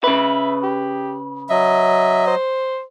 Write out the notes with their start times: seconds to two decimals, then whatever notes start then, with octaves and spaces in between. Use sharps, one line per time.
0.04 C#3 B4 E5
0.63 G4
1.50 F#3 D#5 E5
2.27 C5